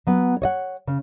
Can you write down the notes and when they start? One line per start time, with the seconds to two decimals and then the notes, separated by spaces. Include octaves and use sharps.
0.07 F#3 B3
0.42 C#5 D#5 F#5
0.87 C#3